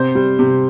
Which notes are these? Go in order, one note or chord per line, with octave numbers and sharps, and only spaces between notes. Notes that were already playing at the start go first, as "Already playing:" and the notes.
Already playing: C3 C5
G3
C3